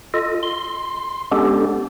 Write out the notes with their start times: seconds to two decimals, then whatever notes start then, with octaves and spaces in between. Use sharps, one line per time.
0.14 F4 A4 D#5
0.43 C6
1.31 G#3 B3 C#4 D4 G4 A4